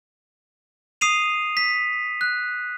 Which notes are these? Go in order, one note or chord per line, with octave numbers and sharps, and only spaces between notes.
D#6 C7 D#7 F7
B6
F#6